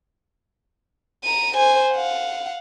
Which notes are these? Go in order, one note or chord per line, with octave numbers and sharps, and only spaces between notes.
A#5 D#7
C5 G#5
F5 F#5